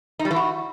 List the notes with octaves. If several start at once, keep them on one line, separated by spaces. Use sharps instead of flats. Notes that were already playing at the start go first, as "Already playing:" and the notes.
D#4
G3
E3
F#4